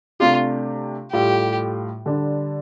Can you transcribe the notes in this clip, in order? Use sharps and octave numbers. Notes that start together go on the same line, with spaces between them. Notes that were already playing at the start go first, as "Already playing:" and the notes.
C3 A3 D4 F4 G4
A2 G3 F4 G4 A4
D3 G3 D4